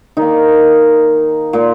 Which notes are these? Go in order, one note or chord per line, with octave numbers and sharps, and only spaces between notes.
D#3 A#3 D#4
A#2 A#3